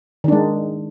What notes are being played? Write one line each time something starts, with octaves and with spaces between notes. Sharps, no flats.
D#3 G#3 D4